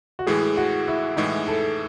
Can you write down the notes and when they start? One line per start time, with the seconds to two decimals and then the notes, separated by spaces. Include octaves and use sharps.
0.19 F#4
0.27 A2 E3 G#3 G#4
0.57 F#4
0.88 E4
1.17 A2 E3 G#3 D#4
1.48 A4